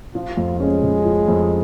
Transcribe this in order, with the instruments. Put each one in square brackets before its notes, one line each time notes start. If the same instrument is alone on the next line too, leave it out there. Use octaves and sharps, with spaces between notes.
[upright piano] F3 [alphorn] F4
[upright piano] F2
[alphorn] G#3 [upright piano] C#4
[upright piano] C#3
F3
F2